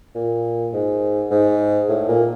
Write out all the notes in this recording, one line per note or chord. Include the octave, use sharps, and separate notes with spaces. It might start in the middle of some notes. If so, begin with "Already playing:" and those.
A#2
G#2
G#2
A2
A#2